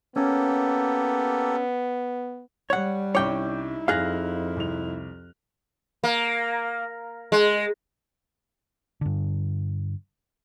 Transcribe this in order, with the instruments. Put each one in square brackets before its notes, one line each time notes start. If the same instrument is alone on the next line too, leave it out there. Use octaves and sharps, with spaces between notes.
[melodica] A#3 G4 A4 [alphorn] B3 [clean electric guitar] C#4
[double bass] G3 [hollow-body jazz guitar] C#5 F#5
[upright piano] C2 C#4 D6 [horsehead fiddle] D#4 E4 [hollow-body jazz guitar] C#5 G5
[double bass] F2 [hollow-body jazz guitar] G#4 F5 [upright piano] F6 F#6 A#6
[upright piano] C2 F7
[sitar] A#3
G#3
[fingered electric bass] G2 D3